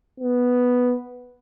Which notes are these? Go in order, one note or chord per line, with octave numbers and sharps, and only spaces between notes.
B3